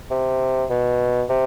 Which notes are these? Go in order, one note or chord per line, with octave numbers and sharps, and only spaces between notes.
C3
B2
C3